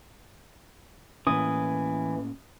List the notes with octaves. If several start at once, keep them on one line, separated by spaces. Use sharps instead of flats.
A2 E3 A#3 C#4 D#6